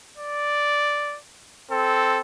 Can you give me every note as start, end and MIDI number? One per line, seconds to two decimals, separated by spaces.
0.17 1.19 74
1.71 2.20 60
1.71 2.20 69